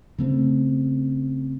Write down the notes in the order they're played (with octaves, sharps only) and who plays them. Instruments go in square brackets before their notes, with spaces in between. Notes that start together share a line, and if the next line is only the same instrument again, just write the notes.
[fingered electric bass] C#3 A3 C4